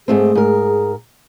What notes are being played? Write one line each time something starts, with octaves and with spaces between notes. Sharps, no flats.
G#2 A3 C4 G#4
G#2 A#4